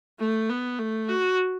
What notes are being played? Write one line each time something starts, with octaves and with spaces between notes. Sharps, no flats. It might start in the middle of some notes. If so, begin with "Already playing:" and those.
A3
B3
A3
F#4